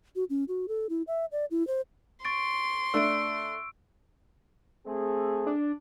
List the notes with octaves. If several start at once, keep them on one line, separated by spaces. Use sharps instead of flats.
F#4
C#4
F#4
A4
E4
E5
D5
E4
C5
C6 C#6 A6 D7
A3 D4 E6 D7
A3 C4 G#4
D4